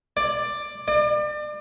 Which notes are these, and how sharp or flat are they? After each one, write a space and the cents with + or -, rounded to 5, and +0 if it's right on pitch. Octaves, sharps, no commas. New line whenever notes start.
D5 +10
D5 +35